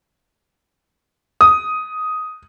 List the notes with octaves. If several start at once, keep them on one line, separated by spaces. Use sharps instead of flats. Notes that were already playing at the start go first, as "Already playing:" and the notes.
D#6